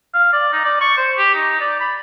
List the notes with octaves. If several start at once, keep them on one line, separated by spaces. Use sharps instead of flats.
F5
D5
D#4
D5
C#6
C5
G4
D#4
D5
B5